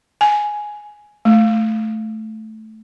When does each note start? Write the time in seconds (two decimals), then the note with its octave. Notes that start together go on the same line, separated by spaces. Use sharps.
0.21 G#5
1.25 A3